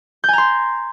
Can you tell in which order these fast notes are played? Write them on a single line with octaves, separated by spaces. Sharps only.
G6 G#5 A#5 C6